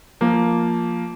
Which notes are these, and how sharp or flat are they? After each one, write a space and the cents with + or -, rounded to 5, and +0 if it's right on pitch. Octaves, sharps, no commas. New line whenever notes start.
F3 +0 A#3 +0